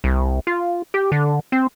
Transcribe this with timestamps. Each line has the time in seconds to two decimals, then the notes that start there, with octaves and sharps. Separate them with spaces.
0.04 C2
0.47 F4
0.94 G4
1.12 D3
1.52 C4